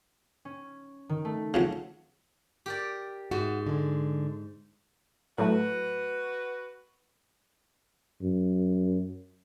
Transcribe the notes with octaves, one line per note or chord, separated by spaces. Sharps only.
C#4
D#3
A3
C#3 F3 F#3
G4 A#4 D5
G#2 F#4
D3 G#3
A2 F#3 A3 F#4 B4
F#2